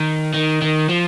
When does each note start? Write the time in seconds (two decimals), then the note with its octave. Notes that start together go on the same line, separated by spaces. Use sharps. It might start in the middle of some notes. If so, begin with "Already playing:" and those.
Already playing: D#3
0.34 D#3
0.62 D#3
0.89 F3